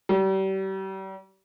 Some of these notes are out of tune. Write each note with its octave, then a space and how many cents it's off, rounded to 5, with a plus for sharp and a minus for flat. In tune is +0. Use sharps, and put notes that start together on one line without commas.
G3 -35